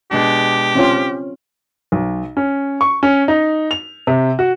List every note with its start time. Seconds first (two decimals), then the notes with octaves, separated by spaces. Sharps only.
0.11 B2 G#3 D4 G4
0.75 C4 C#4 F4
1.92 B1
2.37 C#4
2.81 C#6
3.03 C#4
3.28 D#4
3.71 F7
4.07 C3
4.39 F#4